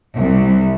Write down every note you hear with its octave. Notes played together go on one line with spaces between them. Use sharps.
C2